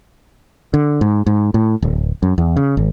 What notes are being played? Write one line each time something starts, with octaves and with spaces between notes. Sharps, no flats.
D3
G#2
G#2
A2
D1
F#2
E2
C#3
G#1